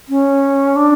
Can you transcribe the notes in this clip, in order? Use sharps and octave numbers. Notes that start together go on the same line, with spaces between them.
C#4
D4